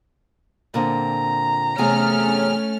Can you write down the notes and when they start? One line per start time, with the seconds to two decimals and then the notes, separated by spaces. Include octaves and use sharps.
0.74 A#2 D3 C4 A#5
1.78 E2 C3 A3 C#4 G#4 F6